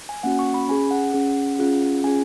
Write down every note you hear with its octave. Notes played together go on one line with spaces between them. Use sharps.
G#5
A#3 C#4 F#4 F#5
C#6
B5
C#4 G#4 G#5
F#5
C#4 G#4
C#4 F4 G#4
C#4 F4 G#4 G#5